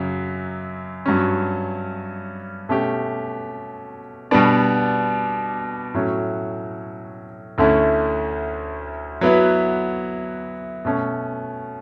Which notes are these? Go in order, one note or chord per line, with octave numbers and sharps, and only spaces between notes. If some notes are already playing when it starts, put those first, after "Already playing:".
Already playing: F#2 C#3 F#3
G2 F#3 C#4
B2 A3 C#4 G4
B2 G3 B3 D4
A2 F#3 C#4
D2 D3 A3 C#4 E4
F#3 B3 E4 B4
B2 A3 C#4